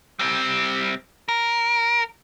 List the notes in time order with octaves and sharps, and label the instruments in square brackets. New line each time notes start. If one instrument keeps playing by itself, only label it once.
[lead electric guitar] G3 C4
A#4